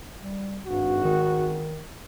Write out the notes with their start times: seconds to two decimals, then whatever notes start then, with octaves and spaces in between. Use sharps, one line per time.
0.21 G3
0.67 G#1 G2 F#4
1.05 D#3